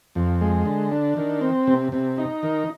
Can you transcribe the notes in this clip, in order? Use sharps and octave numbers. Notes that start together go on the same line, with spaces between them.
F2
G#3
D3
D4
D#3
C4
C3
C3
D#4
D#3